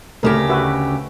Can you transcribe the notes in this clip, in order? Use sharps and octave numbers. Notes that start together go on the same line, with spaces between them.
D2 C#3 A3 G4 A#4
F#4 B4 E5